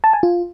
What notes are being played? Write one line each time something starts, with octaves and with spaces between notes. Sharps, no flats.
A5
G#5
F4